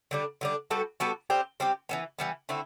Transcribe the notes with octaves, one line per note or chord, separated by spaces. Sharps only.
D3 G3 D4
D3 G3 D4
G3 B3 F#4 A4
G3 B3 F#4 A4
G3 C4 G4
G3 C4 G4
E3 G3 B3
E3 G3 B3
D3 A3 C4 E4